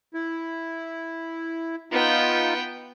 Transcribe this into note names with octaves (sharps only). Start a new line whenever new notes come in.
E4
B3 D#4 F4 G5